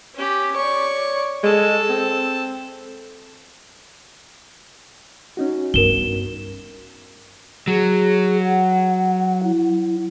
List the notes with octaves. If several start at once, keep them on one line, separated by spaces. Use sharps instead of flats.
C#4 G4
C#5 D5 C#6
G#3 A4 A5
C4
C#4 D#4 F#4
G2 B3 A#4 E7 G7
F#3 G#4
F#5
E4